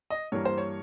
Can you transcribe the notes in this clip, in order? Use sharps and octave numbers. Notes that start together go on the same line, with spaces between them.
D#5
G2 E3 G3 A#3 C#5
C5
C#5